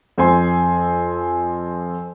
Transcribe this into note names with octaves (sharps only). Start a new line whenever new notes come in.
F2 C4 G#5 C6